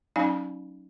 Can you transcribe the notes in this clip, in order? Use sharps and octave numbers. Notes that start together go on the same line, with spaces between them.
F#3 C#4 D#4 F5 G#5 B5